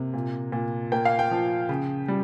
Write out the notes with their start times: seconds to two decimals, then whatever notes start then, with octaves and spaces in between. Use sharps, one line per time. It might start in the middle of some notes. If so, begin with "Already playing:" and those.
Already playing: C3 A#3
0.14 A#2
0.52 A#2
0.92 A#3 G5
1.05 F5
1.19 G5
1.31 F3
1.69 C#3
2.08 G3